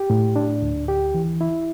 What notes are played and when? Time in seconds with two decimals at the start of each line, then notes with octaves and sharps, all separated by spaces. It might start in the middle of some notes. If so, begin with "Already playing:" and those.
Already playing: G4
0.10 A2
0.36 D4
0.62 D2
0.88 G4
1.14 E3
1.41 E4